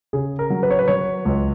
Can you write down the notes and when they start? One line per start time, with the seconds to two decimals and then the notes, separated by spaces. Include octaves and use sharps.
0.13 C#3 G#4
0.39 A#4
0.50 F#3
0.63 B4
0.71 C#5
0.79 B4
0.88 F#3 C#5
1.26 C#2